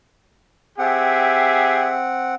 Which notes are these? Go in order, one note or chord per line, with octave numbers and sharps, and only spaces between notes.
C4 G4 G#4 E5 F#5